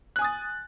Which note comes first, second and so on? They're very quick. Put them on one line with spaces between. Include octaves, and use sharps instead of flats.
F#6 G#5 D#6 A6